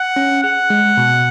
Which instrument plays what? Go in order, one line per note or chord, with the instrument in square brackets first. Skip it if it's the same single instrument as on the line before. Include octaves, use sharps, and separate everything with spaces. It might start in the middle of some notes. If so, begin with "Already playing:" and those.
Already playing: [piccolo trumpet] F#5
[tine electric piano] C#4
[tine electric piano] G#4 [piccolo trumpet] F#5
[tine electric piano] G#3
B2